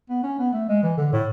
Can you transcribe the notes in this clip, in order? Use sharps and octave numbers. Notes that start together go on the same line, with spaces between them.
B3
C#4
B3
A3
G#3
E3
D3
A2